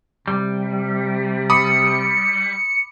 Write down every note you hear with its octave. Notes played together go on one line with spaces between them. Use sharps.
C3 G3
B5 D6 D#6 C#7